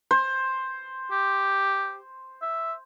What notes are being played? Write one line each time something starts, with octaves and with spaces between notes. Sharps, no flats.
C5
G4
E5